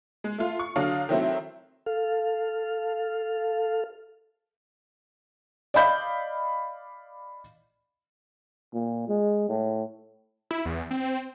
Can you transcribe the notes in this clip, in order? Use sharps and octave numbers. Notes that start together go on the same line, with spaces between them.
G#3
A3 F4
C#6
D3 F#3 D4 F5 D#6
D#3 E3 F#3 A3 C4 E4
A4 F5
D5 D#5 F5 B5 G6
A#2
G#3
A2
E4
E2
C4